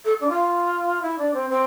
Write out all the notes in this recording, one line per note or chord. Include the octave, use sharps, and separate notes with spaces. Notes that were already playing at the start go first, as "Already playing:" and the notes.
A4
D4
F4
E4
D4
C4
C4